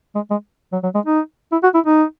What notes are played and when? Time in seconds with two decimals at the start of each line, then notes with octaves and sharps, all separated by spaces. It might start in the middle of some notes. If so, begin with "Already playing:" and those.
0.15 G#3
0.31 G#3
0.73 F#3
0.83 F#3
0.95 G#3
1.06 D#4
1.52 E4
1.63 F#4
1.74 E4
1.86 D#4